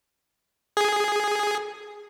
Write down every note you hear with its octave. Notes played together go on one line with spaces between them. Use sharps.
G#4